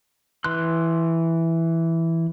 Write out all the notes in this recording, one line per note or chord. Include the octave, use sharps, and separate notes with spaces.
E3 C6 F#6